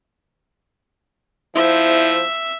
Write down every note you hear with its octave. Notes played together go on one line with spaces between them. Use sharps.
F3 E4 C5 E5